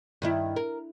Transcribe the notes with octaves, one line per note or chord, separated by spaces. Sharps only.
G2 D#3 E4
A#4